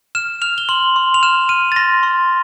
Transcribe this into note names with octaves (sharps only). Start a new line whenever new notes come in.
F6 E7
F6 F7
G7
C6 F#7
C6
F7
F6 E7
F6 D#7
A6
C6 A#6
C6